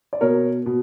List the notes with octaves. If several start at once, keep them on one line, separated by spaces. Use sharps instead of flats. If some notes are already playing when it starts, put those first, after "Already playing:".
D5
B2 A#4 C#5
B2